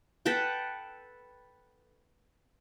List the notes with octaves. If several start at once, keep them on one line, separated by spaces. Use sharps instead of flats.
A4 B4 F#5 G5